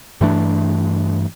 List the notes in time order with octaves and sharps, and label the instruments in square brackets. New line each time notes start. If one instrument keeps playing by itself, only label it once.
[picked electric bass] G2 E3 A3 D4